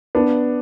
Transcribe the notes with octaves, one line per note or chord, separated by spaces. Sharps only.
B3 D4